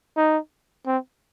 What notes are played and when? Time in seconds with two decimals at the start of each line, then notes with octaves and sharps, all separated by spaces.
0.17 D#4
0.87 C4